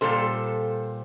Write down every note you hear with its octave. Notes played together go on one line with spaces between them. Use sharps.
A#2 G3 A4 C5